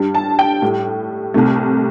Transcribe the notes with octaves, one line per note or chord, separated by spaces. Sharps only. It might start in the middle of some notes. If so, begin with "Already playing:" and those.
Already playing: G2 G3
A5
G5
A2 G3
C2 C3 A3